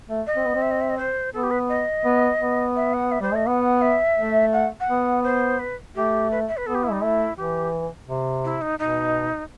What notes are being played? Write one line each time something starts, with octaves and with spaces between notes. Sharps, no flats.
A3
D#5
C4
B3
C4
E5
D#5
E5
D#5
C5
B3 A4
G4
B4
D#5
B3
B3
E5
F#5
E5
G3 C5
A3 D#5
B3 F#5
E5
A3
F#5
F#5
B3
C5
B4
A3 G4
B4
E5
B4
B3 A4
G4
E4
G3 D#4
A3 E4
E3 G4
C3
E4
D#4
B2 D#4